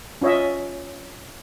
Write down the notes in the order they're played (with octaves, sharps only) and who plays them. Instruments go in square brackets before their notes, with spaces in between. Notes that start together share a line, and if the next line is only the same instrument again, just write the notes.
[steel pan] C#4 F4 C#5 D#5 E5